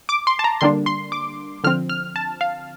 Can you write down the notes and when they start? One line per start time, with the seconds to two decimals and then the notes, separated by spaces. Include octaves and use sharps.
0.09 D6
0.27 C6
0.39 A5
0.44 A#5
0.61 D3 G3 A#3 D4 C6
0.86 C6
1.12 D6
1.64 D3 F3 C4 F6
1.89 F6
2.16 A5
2.41 F5